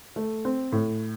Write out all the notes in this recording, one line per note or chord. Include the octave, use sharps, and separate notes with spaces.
A3
C4
A2